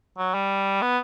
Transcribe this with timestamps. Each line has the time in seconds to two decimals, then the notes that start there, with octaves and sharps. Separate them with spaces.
0.18 F#3
0.34 G3
0.82 B3